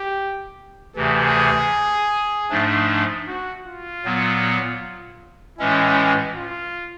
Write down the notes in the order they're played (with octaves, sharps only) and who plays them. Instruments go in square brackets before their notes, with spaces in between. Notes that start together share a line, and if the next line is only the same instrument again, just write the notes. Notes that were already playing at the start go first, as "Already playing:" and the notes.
Already playing: [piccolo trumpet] G4
[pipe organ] D2 C3 E3 [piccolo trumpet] G#4
[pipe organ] G#2 F3 A3 D4
[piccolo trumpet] F#4
F4
[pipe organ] A#2 F#3 B3
[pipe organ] A2 E3 G#3 C#4 [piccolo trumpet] E4
[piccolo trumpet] F4